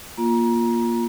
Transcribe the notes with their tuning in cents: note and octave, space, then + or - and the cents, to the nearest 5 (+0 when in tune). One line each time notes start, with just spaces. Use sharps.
A#3 +15 F4 +0 A#5 +25